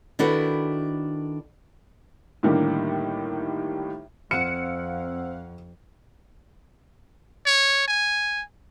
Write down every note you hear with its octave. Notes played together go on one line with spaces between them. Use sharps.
D#3 D4 E4 F#4 A4 B4
A2 D3 D#3 G3 A#3 G4
F2 C4 C5 F5 F#5 E6 C#7
C#5
G#5